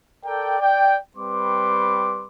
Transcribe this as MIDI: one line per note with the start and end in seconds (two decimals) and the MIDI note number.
0.25 0.57 69
0.25 0.57 70
0.25 0.57 74
0.25 0.57 79
0.59 0.97 74
0.59 0.97 79
1.17 2.28 55
1.17 2.28 60
1.17 2.28 71
1.17 2.28 84
1.17 2.28 86